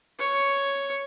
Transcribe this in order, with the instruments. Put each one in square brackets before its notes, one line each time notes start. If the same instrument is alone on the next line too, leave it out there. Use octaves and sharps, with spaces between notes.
[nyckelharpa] C#5